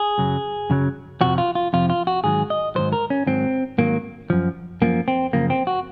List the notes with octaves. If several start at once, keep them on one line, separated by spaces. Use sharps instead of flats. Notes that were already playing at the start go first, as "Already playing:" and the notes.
Already playing: G#4
F#2 C#3 F#3
F#2 C#3 F#3
F2 C3 F3 F#4
F4
F4
F2 C3 F3 F4
F4
F#4
G#2 D#3 F#3 G#4
D#5
G#2 D#3 F#3 C5
A#4
C#4
G#2 D#3 F#3 C4
G#2 D#3 F#3 A#3
F#2 F3
F#2 F3 A#3
C4
F#2 C#3 F3 A#3
C4
F#4